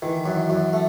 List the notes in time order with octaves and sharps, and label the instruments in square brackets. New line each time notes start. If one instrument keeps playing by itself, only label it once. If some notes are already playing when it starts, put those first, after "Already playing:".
[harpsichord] D#3 [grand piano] E3
[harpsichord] F#2
F#2
A3